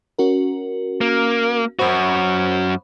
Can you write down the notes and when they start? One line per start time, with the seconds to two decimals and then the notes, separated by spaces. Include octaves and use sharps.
0.19 C#4 F#4 A#4
1.01 A#3
1.79 F#2 F#4 C5 B5